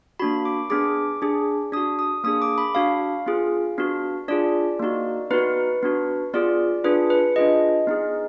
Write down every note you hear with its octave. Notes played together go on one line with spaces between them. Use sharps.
A#3 D4 F#4 B5
D6
B3 D4 G#4 D6
D4 G#4
D4 F#4 D#6
D#6
A#3 D4 G#4 D#6
D6
B5
D4 F#4 F5
B3 F4 G#4
B3 D4 F#4
D4 F4 G#4 D5
A#3 D#4 F#4
B3 D#4 F#4 B4
B3 D4 F#4
B3 F4 G#4 D5
D4 F4 G#4 B4
B4
D4 F4 G#4 D#5
B3 D#4 G#4